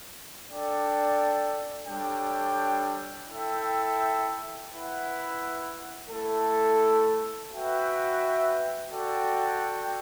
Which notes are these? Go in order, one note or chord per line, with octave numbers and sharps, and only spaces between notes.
D4 A4 D5 G5
G3 D4 A4 C#5 G5
E4 A4 E5 G5
E4 B4 F#5
A3 E4 A4
F#4 B4 E5 G5
F#4 A4 D5 G5